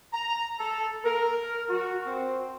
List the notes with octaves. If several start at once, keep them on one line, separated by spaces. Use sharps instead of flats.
A#5
A4
A#4
F#4
C4